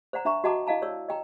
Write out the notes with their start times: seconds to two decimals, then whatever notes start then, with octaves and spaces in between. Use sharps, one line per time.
0.13 C5 D5 F#5 A#5
0.25 D4 E5 A#5 C#6
0.44 F#4 D#5 F#5 A5 A#5 D6
0.67 E4 D#5 F5 A5 A#5
0.82 C#5 D5 E6
1.09 D#5 G5 A#5